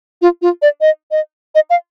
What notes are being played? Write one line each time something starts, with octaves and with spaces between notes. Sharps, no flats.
F4
F4
D5
D#5
D#5
D#5
F5